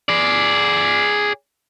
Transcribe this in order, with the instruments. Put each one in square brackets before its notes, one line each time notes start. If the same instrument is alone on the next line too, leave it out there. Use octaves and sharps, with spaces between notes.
[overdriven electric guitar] G#4 D5